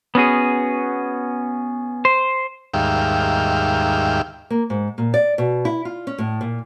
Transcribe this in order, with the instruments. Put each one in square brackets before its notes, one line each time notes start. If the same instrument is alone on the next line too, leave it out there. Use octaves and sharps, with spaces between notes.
[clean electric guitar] B3 C#4 F#4 G#4
C5
[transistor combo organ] D#2 G#2 G3 E5 F5 G5
[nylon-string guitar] A#3
G#2
A#2
D5
B2
E4
F4
C#4
A2
A#2